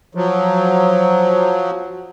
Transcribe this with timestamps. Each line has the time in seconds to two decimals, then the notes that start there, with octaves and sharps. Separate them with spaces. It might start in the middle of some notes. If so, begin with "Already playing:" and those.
0.15 F3 F#3